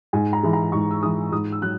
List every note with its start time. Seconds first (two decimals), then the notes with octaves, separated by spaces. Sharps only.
0.13 G#2 G#5
0.33 A#5
0.43 E3 G#3
0.53 A#5
0.72 G#2 C#6
0.91 E6
1.02 E3 G#3 D#6
1.32 G#2 D#6
1.52 E6
1.62 F#3 F#6